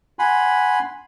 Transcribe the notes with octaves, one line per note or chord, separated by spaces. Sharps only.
F#5 G#5 B5 C6